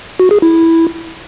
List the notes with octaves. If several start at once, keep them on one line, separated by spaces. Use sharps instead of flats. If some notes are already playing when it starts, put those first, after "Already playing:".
F#4
G#4
E4